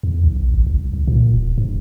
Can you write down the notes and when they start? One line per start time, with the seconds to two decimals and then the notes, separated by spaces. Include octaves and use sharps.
0.03 E2
0.24 B1
0.36 A#1
0.54 G#1
0.67 C2
0.93 C2
1.08 A#2
1.34 D#1
1.58 G2